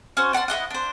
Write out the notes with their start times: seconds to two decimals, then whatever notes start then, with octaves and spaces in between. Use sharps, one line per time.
0.17 C#4 F#4 C5
0.33 D5 F#5 A5 C6
0.48 E4 G#4 D#5 F#5
0.70 D4 C5